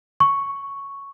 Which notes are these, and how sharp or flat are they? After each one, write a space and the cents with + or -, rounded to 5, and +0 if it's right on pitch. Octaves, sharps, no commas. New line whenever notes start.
C#6 +0